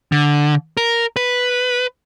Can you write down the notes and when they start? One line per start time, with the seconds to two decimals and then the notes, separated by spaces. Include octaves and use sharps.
0.12 D3
0.77 A#4
1.16 B4